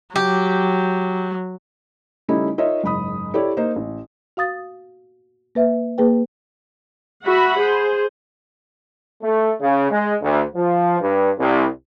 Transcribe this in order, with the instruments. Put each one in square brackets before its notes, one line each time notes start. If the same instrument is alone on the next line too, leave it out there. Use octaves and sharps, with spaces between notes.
[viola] F#3 [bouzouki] G4
[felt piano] C#3 G3 A3 C#4 D#4 E4
D#4 F4 A#4 C#5 D#5 E5
F#1 G#2 B5 D#6
E4 G4 A4 C#5 D5
A#3 D#4 C5
A1
[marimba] F#4 F5 D#6 A6
A#3 B4 E5
A#3 G#4 B4 G5
[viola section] F#4 E5 F#5 B5
G#4 C5
[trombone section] A3
C#3
G#3
D2
F3
G2
C2